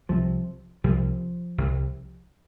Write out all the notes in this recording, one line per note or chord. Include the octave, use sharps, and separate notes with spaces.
C2 C3 F3
C2 C3 F3
C2 C3